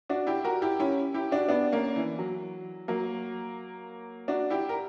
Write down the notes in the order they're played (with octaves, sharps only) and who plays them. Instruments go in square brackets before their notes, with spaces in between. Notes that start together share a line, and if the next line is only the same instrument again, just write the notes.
[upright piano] D4 F#4
E4 G4
F#4 A#4
E4 G4
C#4 E4
E4 G4
D4 F#4
B3 D4
A#3 C#4
E3
F#3
F#3 A#3
D4 F#4
E4 G4
A#4